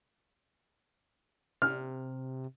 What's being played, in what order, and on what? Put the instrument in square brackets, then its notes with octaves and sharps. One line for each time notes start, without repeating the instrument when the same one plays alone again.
[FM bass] C3 [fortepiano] F6